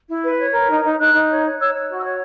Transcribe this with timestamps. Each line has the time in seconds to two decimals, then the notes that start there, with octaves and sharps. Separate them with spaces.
0.08 E4
0.23 B4
0.38 C#5
0.52 A#4
0.68 D#4
0.83 D#4
0.98 D#4 F#6
1.13 D#4
1.29 C#5
1.44 C#5
1.58 C#5 E6
1.73 C#5
1.89 F#4
1.98 E6
2.03 C#5